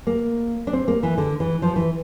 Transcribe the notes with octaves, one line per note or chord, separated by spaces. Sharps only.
A#3
D4
C4
A#3
E3
D3
E3
F3
E3